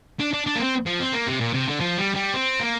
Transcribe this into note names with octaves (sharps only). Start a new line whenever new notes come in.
D4
D4
D4
A#3
C4
F3
C4
A#3
C3
A#2
C3
D3
F3
G3
G3
C4
A#3